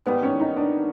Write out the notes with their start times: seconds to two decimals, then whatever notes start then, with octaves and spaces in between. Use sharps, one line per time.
0.06 G#2 D#3 G3 B3
0.23 C#4
0.40 D#4
0.57 D4